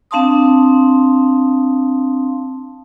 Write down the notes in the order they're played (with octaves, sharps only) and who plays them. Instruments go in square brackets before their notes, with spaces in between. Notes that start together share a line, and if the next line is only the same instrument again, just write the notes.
[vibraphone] C4 D4 F5 A5 C6 D#6